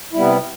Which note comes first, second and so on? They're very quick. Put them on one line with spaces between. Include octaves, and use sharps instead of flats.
E4 G3 B3 C3